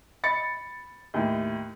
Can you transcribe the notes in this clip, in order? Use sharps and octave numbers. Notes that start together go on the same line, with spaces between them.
B5 A6 C#7
D#2 A2